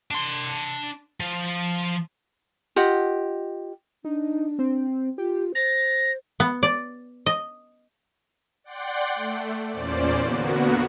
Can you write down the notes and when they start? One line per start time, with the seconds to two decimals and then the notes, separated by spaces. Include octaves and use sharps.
0.11 D4 C6
1.20 F3
2.76 F4 G4 D#5 F#5
4.05 D4 D#4
4.59 C4
5.18 F4 G4
5.55 C5 A6 A#6
6.40 B3
6.63 D5
7.26 D#5
8.64 D5 F#5 G5 C6
9.15 A3
9.69 E2 A#2 C#4 C5 D5
10.23 D3 A#3 B3 F#4